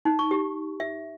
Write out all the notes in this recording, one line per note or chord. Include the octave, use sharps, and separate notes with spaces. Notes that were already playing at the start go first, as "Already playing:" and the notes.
D#4
C#6
G4
E5